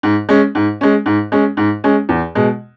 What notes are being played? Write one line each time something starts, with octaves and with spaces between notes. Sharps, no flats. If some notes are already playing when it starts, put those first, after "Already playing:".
G#2
G#3 C#4
G#2
G#3 C#4
G#2
G#3 C#4
G#2
G#3 C#4
E2
B2 G#3